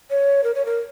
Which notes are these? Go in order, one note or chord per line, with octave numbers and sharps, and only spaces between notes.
C#5
A#4
C#5
A#4